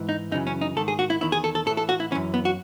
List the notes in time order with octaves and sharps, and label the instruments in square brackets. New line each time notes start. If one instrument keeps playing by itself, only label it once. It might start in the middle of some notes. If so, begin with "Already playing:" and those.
Already playing: [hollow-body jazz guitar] G#2 E3
D#4
F#2 C#3 E3 D#4
C#4
D#4
G#2 D#3 A4
G#4
F#4
E4
E2 D#3 E4
G#4
A4
A4
A2 A4
E3
A4
F#4
E4
E3 C#4
F#2
B3
F#4